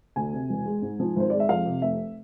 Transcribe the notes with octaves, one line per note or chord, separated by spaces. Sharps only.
D2 G#5
C3
E1
G#3
G#2
F3
G#1 C5
G#3 D5
E5
F2 F5
C3
F1 E5